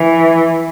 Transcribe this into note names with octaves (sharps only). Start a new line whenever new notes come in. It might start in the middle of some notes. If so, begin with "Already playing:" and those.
Already playing: E3